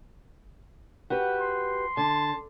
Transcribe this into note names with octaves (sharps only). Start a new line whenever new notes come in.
F#4 G4 B4
C6
D3 A5